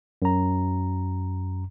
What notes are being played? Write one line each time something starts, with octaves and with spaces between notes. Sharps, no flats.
F#2 A#5